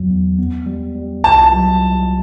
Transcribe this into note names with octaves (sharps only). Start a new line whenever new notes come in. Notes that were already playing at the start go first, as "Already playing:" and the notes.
Already playing: E2 F#3
E2
B3
G3
G3
C2 A5
F#3